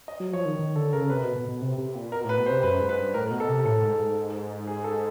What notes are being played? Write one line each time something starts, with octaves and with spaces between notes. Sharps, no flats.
D#5
F#3
F3 C#5
D#3
D#3
D3 A4
C#3 A#4
C3 B4
B2
B2
B2
C3
C3
A#2
B2 A#4
A2 B4
B2
C5
C3
F#2 B4
G#2
B4
G2
A2 A#4
B2
A4
C3
A2 A4
G#2
G#2
G#4
A4